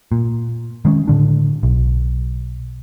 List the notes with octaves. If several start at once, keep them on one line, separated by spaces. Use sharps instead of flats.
A#2
D#3 G#3 C4 C#4
A2 D3 D4
B1